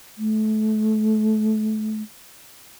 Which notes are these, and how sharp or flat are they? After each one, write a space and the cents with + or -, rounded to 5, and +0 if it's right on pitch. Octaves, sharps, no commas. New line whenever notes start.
A3 -30